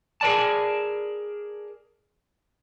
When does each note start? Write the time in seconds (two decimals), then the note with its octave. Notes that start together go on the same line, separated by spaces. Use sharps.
0.21 G#4 A#4 D5 A5